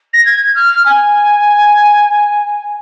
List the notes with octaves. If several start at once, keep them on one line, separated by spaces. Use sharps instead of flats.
A#6
G#6
F6
G#5